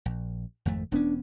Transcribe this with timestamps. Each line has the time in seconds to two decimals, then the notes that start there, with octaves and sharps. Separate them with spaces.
0.06 A#1
0.65 G#1 F2 A3
0.92 E1 B3 C#4 D4